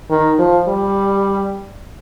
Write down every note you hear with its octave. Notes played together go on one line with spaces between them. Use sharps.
D#3
F3
G3